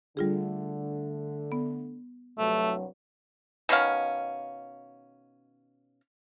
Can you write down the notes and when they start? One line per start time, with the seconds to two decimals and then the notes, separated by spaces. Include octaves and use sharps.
0.17 D3 G3 A3 F4 G#4
1.52 B3
2.38 C2 G2 F#3 A3
3.69 B2 D#3 C#4 F5